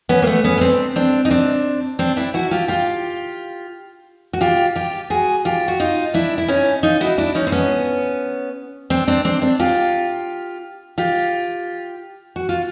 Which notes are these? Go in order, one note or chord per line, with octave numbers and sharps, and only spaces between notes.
B3 C#4
A#3
A3 B3
B3 C#4
C#4
C4 D4
C4 D4
D#4
C4 D4
C4 D4
D4 E4
E4 F#4
F4 G4
F4 G4
F#4
F4 G4
F4 G4
F#4 G#4
F4 G4
F#4
D#4 F4
D4 E4
E4
C#4 D#4
D#4 F4
E4 F#4
D4 E4
C#4 D#4
C4
B3 C#4
C4 D4
C4 D4
C4 D4
C4 D4
F4 G4
F4 G4
F#4
F4